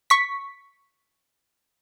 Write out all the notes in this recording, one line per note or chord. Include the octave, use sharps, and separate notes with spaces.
C#6 B6